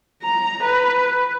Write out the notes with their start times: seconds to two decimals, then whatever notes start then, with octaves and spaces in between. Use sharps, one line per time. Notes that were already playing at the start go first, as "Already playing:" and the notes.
0.23 A#5
0.63 B4